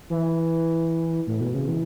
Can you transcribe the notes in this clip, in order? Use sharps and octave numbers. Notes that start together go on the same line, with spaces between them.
E3
A2
B2
C#3
E3